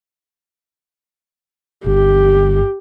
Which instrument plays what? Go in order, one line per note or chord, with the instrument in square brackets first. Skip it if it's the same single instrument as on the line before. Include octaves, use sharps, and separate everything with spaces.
[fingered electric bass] G1 [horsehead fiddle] G4